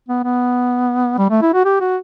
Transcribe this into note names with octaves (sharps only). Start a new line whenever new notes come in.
B3
B3
G3
A3
E4
F#4
G4
F#4